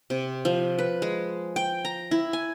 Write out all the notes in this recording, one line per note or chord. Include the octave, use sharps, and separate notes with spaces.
C3
F3
B4
G#3
G5
A#5
E4
G#5